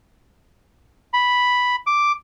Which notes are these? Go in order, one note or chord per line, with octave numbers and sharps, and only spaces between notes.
B5
D6